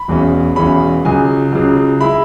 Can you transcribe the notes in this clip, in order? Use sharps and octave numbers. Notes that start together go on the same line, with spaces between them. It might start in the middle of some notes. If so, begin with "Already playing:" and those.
Already playing: B5
E1 E2 E3 G#3 C#4
E1 E2 E3 G#3 C#4 B5
C#2 C#3 F#3 G#5
C#2 C#3 F#3
G#3 E4 B5